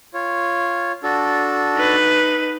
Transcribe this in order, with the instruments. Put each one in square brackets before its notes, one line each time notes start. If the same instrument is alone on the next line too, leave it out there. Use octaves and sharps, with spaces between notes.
[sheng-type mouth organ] F4 C#5
D4 F#4 A4
[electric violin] D#4 B4